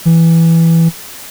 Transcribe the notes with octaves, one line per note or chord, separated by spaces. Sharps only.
E3